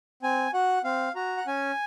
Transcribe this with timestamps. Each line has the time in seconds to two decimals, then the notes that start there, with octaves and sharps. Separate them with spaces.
0.23 C4 G#5
0.54 F#4 F#5
0.84 C4 F5
1.15 F#4 A#5
1.37 F#5
1.47 C#4 G#5